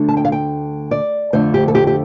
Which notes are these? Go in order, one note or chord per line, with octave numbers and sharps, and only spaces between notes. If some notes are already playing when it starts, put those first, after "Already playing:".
Already playing: D2 D3 A3 D4
A5
G5
F5
G5
D5
F2 D3 A3 C5
G4
A4
G4
G4